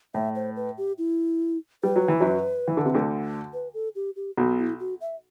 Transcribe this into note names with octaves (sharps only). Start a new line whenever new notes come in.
A2 E5
C5
B4
G4
E4
G3 B4
F#3
E3
F#2 F#3
E3
D3
C3
D2 D3
B4
A4
G4
G4
B1 B2 F#4
E4
F#4
E5